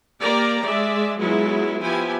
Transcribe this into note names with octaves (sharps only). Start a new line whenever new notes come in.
A#3 G4 A#4 D5 A#5
G#3 D5 E5
F#3 G#3 B3 E4 F4
F3 B3 E4 G4 G#5